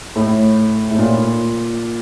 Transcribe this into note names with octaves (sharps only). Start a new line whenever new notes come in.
A2
A2
A#2